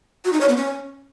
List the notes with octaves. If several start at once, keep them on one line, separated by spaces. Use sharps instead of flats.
F#4
D#4
C#5
B3
C#4